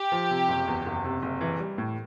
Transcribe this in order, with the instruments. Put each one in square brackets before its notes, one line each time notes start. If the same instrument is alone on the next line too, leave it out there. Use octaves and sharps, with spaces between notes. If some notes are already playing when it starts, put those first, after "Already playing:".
Already playing: [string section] G4
[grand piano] F3
C3
F#1
E2
F#1
C3
F#1
E3
G3
A2